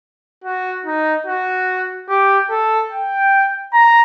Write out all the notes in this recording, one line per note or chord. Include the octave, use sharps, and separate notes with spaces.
F#4
D#4
F#4
G4
A4
G5
A#5